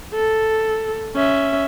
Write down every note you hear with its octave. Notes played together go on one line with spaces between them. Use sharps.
A4
C#4 E5